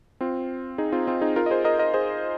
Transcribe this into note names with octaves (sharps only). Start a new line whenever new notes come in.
C4 F4
D#4 G#4
C4 F4
C4 F4
D#4 G#4
F4 A#4
D#5
G#4 C5
A#4 D#5
A#4 D#5
G#4 C5